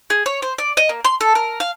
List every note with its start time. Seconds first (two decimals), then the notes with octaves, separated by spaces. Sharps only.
0.10 G#4
0.26 C#5
0.42 C5
0.58 D5
0.77 D#5
0.89 A#3
1.05 C6
1.21 A4
1.35 A#4
1.60 F5